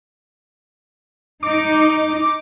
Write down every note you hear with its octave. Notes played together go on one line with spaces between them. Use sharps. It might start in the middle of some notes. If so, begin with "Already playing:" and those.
D#4 D6